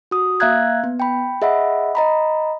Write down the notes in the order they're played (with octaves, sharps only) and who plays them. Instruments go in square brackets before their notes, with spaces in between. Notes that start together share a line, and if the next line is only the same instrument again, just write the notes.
[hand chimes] F#4 D#6
A#3 E5 F5 A#5 F#6 G#6
B3
G5 B5
G#4 D#5 E5 F#5 B5
D#5 A#5 B5